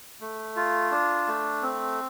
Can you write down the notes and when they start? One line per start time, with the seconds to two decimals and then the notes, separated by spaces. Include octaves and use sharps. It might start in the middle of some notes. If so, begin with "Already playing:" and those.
0.21 A3
0.56 F4
0.91 D4
1.28 A3
1.62 C4